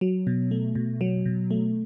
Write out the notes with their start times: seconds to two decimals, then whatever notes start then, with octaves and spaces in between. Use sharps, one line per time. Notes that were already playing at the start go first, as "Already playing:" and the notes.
0.01 F#3
0.27 B2
0.51 A3
0.75 B2
1.01 F#3
1.26 B2
1.51 A3